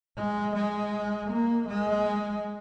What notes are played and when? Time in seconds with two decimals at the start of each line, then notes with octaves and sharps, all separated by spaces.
0.17 G#3
0.55 G#3
1.30 A#3
1.68 G#3